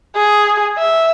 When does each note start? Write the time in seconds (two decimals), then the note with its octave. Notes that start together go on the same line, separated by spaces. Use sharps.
0.16 G#4
0.78 E5